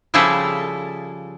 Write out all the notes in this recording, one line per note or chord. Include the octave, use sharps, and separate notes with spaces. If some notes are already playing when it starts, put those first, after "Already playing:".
C#3 F3 G3 E4 G#4 A4